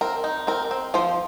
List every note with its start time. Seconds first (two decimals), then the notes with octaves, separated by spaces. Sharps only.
0.01 C4 A#4
0.24 D#4
0.47 C4 A#4
0.71 C4
0.94 F3 C5